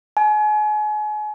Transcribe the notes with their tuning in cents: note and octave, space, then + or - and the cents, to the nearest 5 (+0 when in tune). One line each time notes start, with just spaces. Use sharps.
G#5 +35